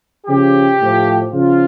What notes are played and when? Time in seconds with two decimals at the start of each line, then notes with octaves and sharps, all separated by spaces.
0.27 C#3 F3 G4
0.79 A2 F3
1.32 C#3 F3 F4